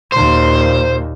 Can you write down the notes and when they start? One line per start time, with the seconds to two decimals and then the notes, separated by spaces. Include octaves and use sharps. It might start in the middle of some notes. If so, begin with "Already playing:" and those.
0.12 D#2 A#2 C5